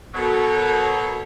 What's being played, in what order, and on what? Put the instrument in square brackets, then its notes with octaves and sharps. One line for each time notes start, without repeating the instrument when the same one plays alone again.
[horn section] B2 F#3 [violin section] A4 A#4 C#5